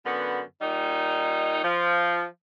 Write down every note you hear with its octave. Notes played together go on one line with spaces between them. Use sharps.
F#2 D3 B3
A#2 G3 D#4
F3